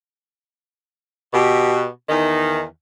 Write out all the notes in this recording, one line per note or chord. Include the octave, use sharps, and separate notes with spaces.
B2 G4
E2 D#3 D#4